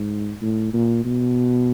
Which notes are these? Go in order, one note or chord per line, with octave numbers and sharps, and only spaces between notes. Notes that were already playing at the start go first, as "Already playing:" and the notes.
Already playing: G#2
A2
A#2
B2